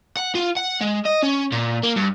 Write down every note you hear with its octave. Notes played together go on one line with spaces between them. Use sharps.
F#5
F4
F#5
G#3
D#5
C#4
A#2
A#3
G2